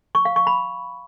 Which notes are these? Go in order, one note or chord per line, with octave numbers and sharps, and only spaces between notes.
C#6
F5
C#6
B5